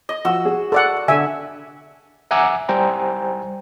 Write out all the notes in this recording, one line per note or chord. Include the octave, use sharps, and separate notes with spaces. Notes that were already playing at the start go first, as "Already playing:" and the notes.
D#5
F3 F#4 E6
G#4
A4 D5 F#5
D3 E5 G#5
E5 F#5 G#5 A#5 D6 E6
G3 C5 G5 G#5 A#5